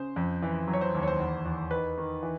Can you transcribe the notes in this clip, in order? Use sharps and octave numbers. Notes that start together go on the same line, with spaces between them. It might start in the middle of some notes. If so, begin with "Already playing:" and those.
Already playing: C#3 C5
F2
E3
F#3
C#5
C5
D#2
C#5
C5
E2
E2
D#3 B4
D#3
E3